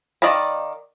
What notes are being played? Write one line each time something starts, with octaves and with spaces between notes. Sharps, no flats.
D#3 D5 D#5 F5 B5